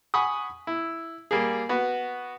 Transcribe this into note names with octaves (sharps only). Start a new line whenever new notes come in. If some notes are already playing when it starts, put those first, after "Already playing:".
F#5 G#5 B5 C#6 D#6
E4
G3 A#3 G#4
B3 F#4